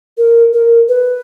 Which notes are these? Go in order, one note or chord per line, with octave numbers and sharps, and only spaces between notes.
A#4
A#4
B4